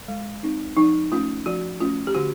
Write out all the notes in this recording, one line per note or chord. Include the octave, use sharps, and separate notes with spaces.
G#3
C4 D#4
F3 D#4
A3 C#4 F4
F3 F#4
A3 C#4 F4
G4
D3 F#4